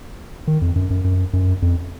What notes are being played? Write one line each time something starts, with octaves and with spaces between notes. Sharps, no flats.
D#3
F2
F#2
F#2
F#2
F#2
F2